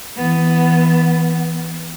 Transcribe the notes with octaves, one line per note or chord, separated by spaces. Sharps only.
E3 B3